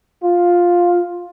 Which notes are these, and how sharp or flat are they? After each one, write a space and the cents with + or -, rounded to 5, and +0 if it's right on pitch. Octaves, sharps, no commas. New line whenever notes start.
F4 +5